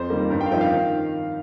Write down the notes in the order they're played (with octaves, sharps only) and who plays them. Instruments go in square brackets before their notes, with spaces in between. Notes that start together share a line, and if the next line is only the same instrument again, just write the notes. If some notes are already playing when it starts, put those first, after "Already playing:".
Already playing: [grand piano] F2 C5
D#3 G3 A#3
G2 A#4
G5
F5
F3 C4 D#4 G5
F5
D#3